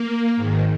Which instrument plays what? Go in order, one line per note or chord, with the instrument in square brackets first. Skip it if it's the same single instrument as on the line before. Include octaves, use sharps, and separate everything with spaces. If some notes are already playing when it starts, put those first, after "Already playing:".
Already playing: [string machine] A#3
G#2 D#3